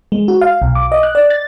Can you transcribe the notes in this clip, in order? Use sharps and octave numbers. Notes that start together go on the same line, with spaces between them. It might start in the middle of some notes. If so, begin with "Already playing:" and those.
G#3
F#4
F5
B1
D6
D#5
F#6
D5
A6